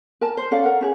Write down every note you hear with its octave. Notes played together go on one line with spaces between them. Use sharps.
A#4 A5
C5
C#4 A4 D5 F5
A#4 F#5
C#4 G4 G#4